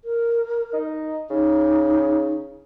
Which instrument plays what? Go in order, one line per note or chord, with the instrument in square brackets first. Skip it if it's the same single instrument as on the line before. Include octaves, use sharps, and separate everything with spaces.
[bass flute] A#4
[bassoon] D#4
[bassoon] C#3 [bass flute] D#4